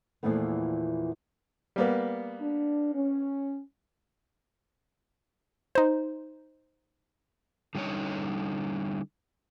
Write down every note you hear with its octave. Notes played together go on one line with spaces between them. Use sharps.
E2 A#2 E3 F3 A3 B3
G3 A#3 B3
D4
C#4
D#4 C5
D3 G3 C#4 D#4 C#5